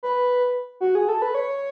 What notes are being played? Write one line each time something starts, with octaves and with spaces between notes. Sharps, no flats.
B4
F#4
G#4
A4
B4
C#5